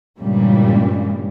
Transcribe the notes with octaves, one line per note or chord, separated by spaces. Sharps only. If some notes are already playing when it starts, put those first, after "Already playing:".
G2 A#2 C#3 E3 G3 G#3